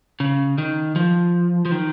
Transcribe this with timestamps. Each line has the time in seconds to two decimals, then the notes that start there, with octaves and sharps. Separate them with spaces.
0.20 C#3
0.58 D#3
0.96 F3
1.65 F3
1.72 D#3